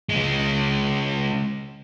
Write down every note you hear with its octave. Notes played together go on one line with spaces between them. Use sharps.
C#3 G#3